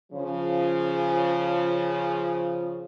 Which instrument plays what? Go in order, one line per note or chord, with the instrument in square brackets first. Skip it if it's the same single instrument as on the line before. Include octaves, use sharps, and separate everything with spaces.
[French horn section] C#3 F3